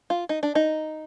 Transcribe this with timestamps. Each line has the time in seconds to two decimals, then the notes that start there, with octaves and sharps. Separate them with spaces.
0.10 F4
0.29 D#4
0.43 D4
0.55 D#4